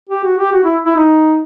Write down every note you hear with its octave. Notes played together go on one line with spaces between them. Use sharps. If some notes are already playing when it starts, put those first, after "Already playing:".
G4
F#4
G4
F#4
E4
E4
D#4